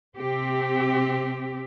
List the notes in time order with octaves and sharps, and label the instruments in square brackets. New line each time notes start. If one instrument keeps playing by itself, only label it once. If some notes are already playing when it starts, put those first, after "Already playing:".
[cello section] C3 C4 G4